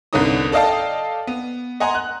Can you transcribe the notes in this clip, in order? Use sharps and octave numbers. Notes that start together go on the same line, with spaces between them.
C2 G2 D3 C#4 D#4 D#6
A4 D5 D#5 F5 G5 A5
B3
D#5 F#5 G#5 A#5 C6
F#6